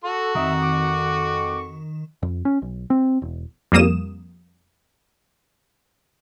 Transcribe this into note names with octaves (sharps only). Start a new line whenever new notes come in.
F#4 A4 C#6
F2 D#3 E5
D6
F2
C#4
B1
C4
E1
F2 G3 A#3 D#6 E7